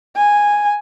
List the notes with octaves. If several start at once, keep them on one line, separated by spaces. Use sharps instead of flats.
G#5